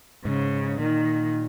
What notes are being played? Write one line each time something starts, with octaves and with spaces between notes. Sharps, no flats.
G#2 C#3
A#2 D#3